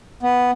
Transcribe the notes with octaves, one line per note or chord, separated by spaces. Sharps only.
B3